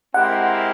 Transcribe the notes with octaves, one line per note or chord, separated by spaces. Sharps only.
G#3 C4 E4 G4 A#4 F#5